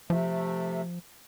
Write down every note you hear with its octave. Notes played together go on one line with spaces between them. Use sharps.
C3 F3 A3